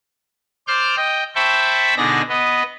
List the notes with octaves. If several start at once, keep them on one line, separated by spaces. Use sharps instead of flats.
C5 D5 C6 D6 F6 G6
D#5 G5
C5 E5 G5 A5 B5 C#6
B2 D3 D#4 G#4 D5 A#6
B3 B4 D#5